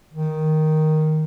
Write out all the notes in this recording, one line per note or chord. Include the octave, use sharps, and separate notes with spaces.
D#3